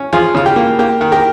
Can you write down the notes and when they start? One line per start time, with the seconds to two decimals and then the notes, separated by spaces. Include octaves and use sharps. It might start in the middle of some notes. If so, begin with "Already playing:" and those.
Already playing: C#4
0.13 F3 F4 G#4
0.35 C#3 F4
0.46 G4
0.56 A#3
0.79 A#3 G4
1.01 D#3
1.12 G4 A#4